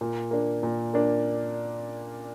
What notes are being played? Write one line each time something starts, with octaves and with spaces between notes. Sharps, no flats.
A#2
A#3 D4
A#2
A#3 D4